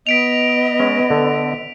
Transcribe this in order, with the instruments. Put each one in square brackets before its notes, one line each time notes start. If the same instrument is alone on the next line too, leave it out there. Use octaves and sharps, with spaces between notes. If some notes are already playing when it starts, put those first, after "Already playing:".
[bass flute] B3 [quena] D#5 [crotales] B6 D7 F7
[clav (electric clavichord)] G#3 C#4
D3 A4